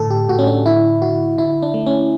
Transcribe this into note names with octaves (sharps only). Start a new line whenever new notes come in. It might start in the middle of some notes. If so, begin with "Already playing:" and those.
Already playing: A2 D3 A4
G4
A2 F#4
C#4
D4
D3 E4
D3 F#4
D3 E4
D4
A3
C#4